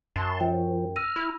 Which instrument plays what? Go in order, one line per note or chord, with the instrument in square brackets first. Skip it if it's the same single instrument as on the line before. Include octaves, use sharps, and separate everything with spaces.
[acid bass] F#2 [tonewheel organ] A5 C6
[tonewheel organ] F3 [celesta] G5
[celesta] E6 A#6 D#7 [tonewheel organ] F6
[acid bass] E4